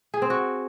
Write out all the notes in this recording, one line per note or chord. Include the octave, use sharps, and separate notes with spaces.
G#4
C4
F#4